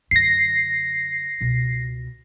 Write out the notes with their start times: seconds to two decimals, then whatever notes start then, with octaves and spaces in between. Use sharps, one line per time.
0.11 F#2 D3 A#6 C7
1.41 C#2 B2